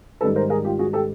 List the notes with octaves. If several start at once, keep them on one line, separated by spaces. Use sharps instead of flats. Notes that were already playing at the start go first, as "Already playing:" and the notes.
G#2 D#3 G3 A4 B4
A#4 C5
G#4 A#4
F4 G4
F#4 G#4
G4 A4